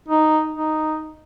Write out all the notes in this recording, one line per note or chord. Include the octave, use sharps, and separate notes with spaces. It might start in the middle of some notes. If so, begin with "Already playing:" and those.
D#4
D#4